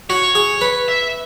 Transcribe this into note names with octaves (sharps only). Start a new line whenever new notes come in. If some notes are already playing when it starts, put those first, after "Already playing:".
F#4 C#5
G#4
B4
E5